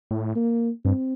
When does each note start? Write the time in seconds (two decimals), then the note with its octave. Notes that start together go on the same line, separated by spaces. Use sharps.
0.11 A2
0.36 A#3
0.85 G2 C4